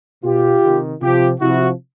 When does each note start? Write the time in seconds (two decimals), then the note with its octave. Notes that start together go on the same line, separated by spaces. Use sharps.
0.24 B2 F4 G4
0.62 C3 D#3
1.01 C3 F3 F4 G4
1.40 C3 F3 E4 F#4